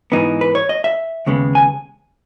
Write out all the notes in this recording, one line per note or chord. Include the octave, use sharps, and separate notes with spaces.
G#2 E3 B3 D#4
B4
C#5
D#5
E5
D#2 C#3 G#3 B3
G#5